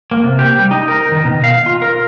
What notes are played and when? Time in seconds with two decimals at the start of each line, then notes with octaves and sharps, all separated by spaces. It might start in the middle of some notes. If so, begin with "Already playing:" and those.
0.11 A#3
0.24 C3
0.39 G4
0.59 G3
0.71 D#4
0.88 A#4
1.12 D#3
1.25 B2
1.44 F5
1.66 F4
1.82 A#4